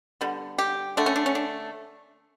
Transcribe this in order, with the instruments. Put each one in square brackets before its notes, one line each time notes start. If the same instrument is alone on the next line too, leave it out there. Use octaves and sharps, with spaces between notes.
[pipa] D3 G3 B3
G4
D3 A3 D4
C#4
D4
C#4
D4